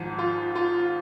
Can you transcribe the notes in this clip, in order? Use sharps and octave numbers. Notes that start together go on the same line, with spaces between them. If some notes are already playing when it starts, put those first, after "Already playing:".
Already playing: G#1 G#2 F3
F4
F4